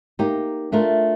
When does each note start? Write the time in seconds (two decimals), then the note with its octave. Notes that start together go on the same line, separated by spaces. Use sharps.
0.19 A#3 D#4 G4
0.72 A3 D4 F4 A#4